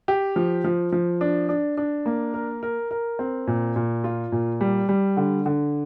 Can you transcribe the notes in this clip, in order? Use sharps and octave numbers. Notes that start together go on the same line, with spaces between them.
G4
F3
F3
F3
D4
D4
D4
A#3
A#4
A#4
A#4
C4
A#2
A#2
F4
A#2
G3
G3
D3
D3